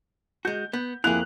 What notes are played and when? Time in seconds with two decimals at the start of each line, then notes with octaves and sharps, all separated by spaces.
0.45 G#3 F#4 G6
0.73 B3
1.04 F2 A#3 E4 G#4 F#6 F7